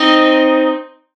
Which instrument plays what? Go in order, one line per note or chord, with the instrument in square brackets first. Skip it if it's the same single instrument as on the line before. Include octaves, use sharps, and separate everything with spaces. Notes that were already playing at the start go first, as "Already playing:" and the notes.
Already playing: [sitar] C4 D#4